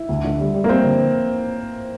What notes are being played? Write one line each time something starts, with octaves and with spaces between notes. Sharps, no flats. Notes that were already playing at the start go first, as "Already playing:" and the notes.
Already playing: E4
D2
D3
G3
G3
A#3
G3 C4
D3